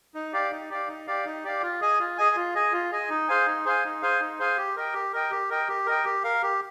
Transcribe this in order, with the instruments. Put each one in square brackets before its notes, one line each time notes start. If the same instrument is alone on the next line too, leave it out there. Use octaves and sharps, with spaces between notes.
[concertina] D#4
G4 D5 F5
D#4
G4 D5 F5
D#4
G4 D5 F5
D#4
G4 D5 F5
F4
G#4 D#5 G#5
F4
G#4 D#5 G#5
F4
G#4 D#5 G#5
F4
G#4 D#5 G#5
D#4
G#4 C5 F5 G#5
D#4
G#4 C5 F5 G#5
D#4
G#4 C5 F5 G#5
D#4
G#4 C5 F5 G#5
G4
A#4 D#5 G5
G4
A#4 D#5 G5
G4
A#4 D#5 G5
G4
A#4 D#5 G5
G4
A#4 F5
G4